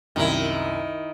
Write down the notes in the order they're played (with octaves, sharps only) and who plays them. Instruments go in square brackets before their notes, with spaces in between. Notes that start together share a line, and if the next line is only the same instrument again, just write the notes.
[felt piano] C2 F#2 [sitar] D#3 E4